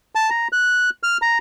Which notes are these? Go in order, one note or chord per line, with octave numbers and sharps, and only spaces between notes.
A5
A#5
F#6
F6
A#5